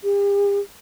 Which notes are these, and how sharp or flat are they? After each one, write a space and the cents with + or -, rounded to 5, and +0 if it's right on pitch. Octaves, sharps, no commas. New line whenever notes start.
G4 +45